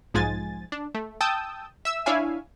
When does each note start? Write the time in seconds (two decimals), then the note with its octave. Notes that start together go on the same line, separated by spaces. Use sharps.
0.14 B1 G#2 F3 G#3 G#5 A6
0.72 D4
0.95 A3
1.21 G5 A5 D#6 E6 G6
1.85 E5 E6
2.06 D4 E4 C#5 E5 F5 G#5